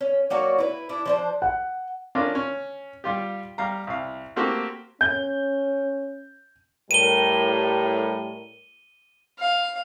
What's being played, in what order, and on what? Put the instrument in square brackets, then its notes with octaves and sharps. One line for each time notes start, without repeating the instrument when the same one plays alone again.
[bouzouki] C#4
F#3 A#3 F#4 D5
E4 B4
D4 E4
F3 D4 C5
[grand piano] F#5
[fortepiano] C#4 D4 F4 A4 A#4 D5
C#4
G3 F4 G4
G3 F5 A#5
C2 F5
A3 A#3 C4 F#4 G4
[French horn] C#4 [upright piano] G6
[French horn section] A2 G3 A#4 [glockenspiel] D#7 G7
[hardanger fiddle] F5